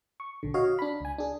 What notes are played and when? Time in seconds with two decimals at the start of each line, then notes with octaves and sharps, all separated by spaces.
0.20 C#6
0.43 A#1 D3
0.54 F#4 C#5 D#5 F5
0.79 D4 B5
1.01 C#2 G#5
1.18 D4 G#4